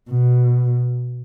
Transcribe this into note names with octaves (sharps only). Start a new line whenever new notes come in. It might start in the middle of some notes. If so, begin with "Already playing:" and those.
B2